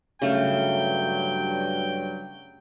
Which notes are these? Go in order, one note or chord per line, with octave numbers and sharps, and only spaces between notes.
G2 C#3 F#3 A3 G5